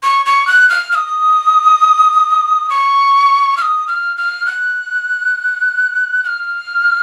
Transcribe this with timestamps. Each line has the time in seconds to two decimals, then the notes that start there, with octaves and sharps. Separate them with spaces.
0.03 C#6
0.26 C#6
0.47 F#6
0.69 F6
0.92 F6
0.95 D#6
2.70 C#6
3.57 F6
3.62 D#6
3.88 F6
4.17 F6
4.46 F#6
6.24 F#6
6.27 F6